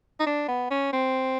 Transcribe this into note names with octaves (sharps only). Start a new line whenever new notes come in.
D#4
D4
B3
C#4
C4